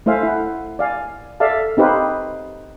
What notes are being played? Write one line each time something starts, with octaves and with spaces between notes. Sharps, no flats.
A3 E4 C5 E5 F5 G#5
E4 F#5
D5 F5 G#5
A4 D5 E5 F5 A5
C4 D#4 G4 B4 C5 F5